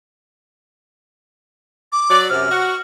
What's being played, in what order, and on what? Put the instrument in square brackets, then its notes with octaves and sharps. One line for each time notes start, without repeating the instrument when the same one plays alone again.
[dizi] D6
[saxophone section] F#3 D5
[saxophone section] F#2 C3 [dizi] F6
[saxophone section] F#4